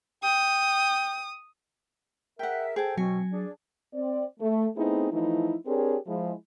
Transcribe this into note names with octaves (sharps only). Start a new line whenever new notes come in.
G5 D#6
G#4 A#4 E5 F#5 G5
G#4 A4 C5 G5 A5
B2 F#3 C4 G#5
D4 G#4 D5
C4 D5
A3
A3 B3 C4 D#4 E4 G#4
E3 F3 A3 D#4 E4
C4 D4 G4 G#4 A#4 C#5
F3 G#3 E4